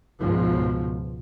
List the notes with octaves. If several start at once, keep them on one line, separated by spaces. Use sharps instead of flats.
C#2 G#2 B2 F3